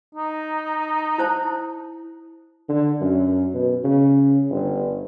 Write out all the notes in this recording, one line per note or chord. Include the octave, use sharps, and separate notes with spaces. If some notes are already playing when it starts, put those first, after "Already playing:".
D#4
E4 C5 A5
D3
F#2
B2
C#3
G1